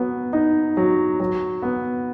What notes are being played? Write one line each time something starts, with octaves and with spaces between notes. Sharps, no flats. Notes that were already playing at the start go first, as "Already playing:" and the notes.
Already playing: F#3 B3
D#4
F#3
F#3
B3